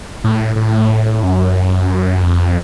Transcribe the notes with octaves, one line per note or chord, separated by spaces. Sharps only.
A2
A2
F#2
F2